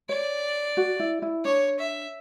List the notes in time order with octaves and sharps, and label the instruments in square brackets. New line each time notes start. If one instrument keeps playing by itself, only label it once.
[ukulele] C#5 [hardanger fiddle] D5
[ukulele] F#4
E4
E4
[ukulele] D4 [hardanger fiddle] C#5
[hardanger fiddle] E5